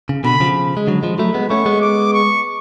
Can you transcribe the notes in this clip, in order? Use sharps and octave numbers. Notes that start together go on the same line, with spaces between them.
C#3
B2 D3 B5
C#3 F3
G#3
D3 F#3
F3 G#3
F#3 A3 B5
G#3 B3
A3 C#4 C#6
G#3 B3
D6
C#6